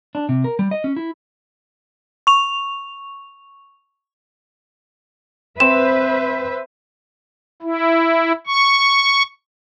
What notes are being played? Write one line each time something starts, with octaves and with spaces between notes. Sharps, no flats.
D4
C3
A#4
G3
D#5
C#4
E4
C#6 F7
C4 B4 C5 E5 E7
E4
C#6